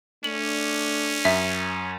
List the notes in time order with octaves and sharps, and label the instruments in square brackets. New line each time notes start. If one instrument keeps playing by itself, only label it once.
[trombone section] A3 D4 [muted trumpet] C#4 [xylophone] F#7
[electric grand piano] F#2 [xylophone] E5